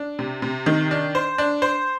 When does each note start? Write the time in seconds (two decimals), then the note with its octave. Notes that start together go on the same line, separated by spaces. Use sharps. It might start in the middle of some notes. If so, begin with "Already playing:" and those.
Already playing: D4
0.19 C3
0.42 C3
0.66 D#3
0.91 D4
1.15 C5
1.38 D4
1.62 C5